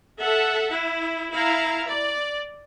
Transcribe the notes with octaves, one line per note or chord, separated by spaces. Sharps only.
A4 E5 F#5
E4
E4 F5 A#5
D5